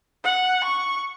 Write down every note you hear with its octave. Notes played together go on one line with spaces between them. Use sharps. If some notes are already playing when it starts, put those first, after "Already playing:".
F#5
C#6